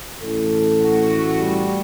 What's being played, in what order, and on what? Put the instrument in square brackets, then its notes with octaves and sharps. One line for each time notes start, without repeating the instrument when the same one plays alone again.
[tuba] A1 [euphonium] A4
[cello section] A3 F#4
[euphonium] G3